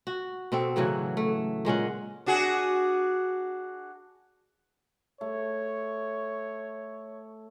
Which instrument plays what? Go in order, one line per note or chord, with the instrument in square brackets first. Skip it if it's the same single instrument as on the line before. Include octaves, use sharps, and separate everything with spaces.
[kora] F#4
B2 C4 A4
A2 C#3 E3 F#3
A3
A#2 G#3 C#4 F#5
[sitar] D4 F#4 G#4
[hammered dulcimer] A3 [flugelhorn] C#5